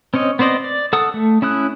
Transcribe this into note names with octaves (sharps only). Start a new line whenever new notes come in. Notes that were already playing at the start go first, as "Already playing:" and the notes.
C4 C#4 C#5 D#5
B3 C4 C5 D5 D#5
D5
A4 F#5 D#6
A3
C#4 E4 D#6 F#6